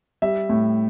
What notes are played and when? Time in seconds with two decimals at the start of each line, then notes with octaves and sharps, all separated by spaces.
0.22 G3 E5
0.49 A2